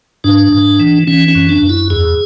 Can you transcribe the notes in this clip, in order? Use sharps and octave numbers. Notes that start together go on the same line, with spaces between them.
G#2 D4
G#2
E3
E3 C#4
C#4
F#2
D4
F#2
E4
E2 G#4